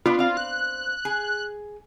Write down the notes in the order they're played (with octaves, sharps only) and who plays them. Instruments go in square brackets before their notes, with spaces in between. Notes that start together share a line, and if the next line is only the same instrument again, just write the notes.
[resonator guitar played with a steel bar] B3 D4 [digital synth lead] F4
[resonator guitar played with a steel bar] C4 F5
[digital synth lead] F#6
[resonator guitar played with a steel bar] G#4